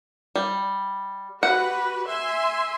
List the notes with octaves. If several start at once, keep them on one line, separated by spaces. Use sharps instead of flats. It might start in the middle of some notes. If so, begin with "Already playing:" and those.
G3
F#4 G4 B4 F#5
E5 G#5 C6